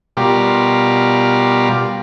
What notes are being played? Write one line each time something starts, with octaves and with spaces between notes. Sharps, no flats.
B2 G3 F4 G4 A#4